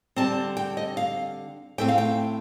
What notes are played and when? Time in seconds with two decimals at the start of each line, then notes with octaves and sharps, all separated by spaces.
0.16 D3 G3 C4 A5
0.57 G5
0.77 D#5
0.97 F5
1.78 A2 A3 C4 G5
1.88 F5
1.98 G5